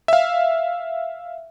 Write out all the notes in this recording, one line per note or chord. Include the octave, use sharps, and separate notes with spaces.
E5 F5